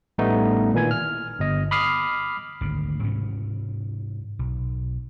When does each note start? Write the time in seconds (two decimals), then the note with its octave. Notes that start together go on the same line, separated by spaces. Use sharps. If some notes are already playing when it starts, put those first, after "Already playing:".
0.18 A1 G3 A3 B3 D#4
0.74 A#2 D#3 E3 G#5 G#6
0.91 F6
1.39 G1 D#5
1.71 B5 D6 D#6 F6 C7
2.61 G#1 D2 D3
3.03 G#2 C3 E3 C#4
4.39 B1